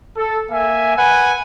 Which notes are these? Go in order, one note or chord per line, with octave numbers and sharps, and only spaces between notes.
A4
A#3 E5 G#5
B4 F#5 G#5